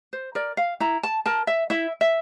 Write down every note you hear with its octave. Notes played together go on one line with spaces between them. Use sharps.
C5
A#4 D5
F5
E4 A#5
A5
A#4 A5
E5
E4 E5
E5